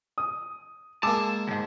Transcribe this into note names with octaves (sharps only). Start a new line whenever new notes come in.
D#6
G#3 A#3 A5 D6 E6
D#2 G#2